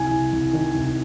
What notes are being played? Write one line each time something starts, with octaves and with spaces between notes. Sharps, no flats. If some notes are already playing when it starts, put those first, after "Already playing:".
Already playing: C2 G#5
C2
C2
D#3
C2